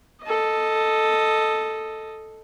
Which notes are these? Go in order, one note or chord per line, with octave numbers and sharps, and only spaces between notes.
A4 D#5